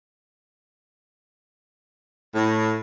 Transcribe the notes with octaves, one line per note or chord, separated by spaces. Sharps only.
A2